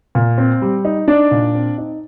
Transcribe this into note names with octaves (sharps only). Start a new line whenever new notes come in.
A#2
C4
G3
D#4
D4 D#4 D5
A#2
C4
D#4